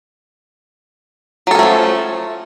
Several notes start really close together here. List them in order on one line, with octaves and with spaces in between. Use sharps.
F#3 A4 C#4 A3 F3